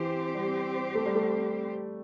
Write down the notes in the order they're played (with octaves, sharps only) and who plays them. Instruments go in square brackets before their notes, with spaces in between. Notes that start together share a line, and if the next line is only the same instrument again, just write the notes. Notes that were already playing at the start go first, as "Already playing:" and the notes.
Already playing: [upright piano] E3 [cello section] C4 G4 C5
[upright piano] G3
A3
G3
A3